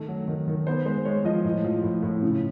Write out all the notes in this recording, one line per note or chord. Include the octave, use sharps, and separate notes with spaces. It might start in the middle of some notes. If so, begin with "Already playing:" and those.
Already playing: D#3 A3
F#3
D#3
D#3
B3 C5
G#3 C5
G#3 C#5
F3 D#5
A2
F3
A2
A2
C#3